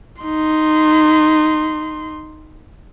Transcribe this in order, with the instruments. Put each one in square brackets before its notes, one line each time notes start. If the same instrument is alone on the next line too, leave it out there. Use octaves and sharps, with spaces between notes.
[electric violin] D#4 C6